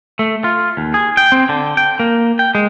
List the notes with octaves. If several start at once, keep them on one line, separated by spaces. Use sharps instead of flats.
A3
F4
D#2
G#4
G5
C4
D3
G5
A#3
G5
G#3